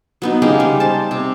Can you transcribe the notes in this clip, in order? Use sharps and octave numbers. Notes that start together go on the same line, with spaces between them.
F#3 B3 D#4
C#3 G#3 A#3 G4
G3
C5 A5
C3